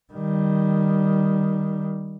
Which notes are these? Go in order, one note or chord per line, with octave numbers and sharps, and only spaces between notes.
D#3 G3